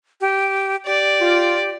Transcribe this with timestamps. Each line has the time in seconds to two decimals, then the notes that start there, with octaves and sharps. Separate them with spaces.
0.21 G4
0.86 G4 D5
1.20 F4